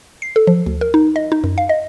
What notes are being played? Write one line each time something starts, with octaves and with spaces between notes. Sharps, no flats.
C7
A4
F3
D2
A#4
D#4
D#5
D#4
F#2
F5
D#5